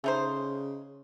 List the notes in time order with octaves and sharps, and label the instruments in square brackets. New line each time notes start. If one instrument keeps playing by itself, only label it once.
[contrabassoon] C#3 [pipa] A3 D#4 C5